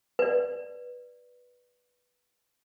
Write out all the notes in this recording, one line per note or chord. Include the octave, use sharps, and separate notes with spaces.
B4 D5